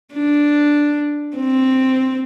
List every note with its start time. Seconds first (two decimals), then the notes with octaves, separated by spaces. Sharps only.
0.14 D4
1.37 C4